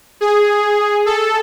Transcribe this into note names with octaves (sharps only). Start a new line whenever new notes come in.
G#4
A4